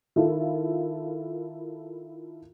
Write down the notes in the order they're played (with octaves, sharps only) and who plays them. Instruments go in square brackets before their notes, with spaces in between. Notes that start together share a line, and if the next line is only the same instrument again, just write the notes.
[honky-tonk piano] D#3 E4 F4 A4 A#4